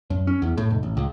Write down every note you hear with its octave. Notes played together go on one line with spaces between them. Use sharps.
F#2
C#4
E2
A2
F1
A1
C#2